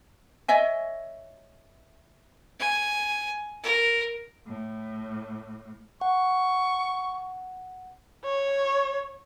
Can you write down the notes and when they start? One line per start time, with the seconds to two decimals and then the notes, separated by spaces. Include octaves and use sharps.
0.48 C#5 D#5 E5 G#5
2.59 G#5
3.63 A#4
4.46 A2
6.01 F#5 C#6
8.25 C#5